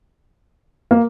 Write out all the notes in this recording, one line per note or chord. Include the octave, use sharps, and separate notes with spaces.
A#3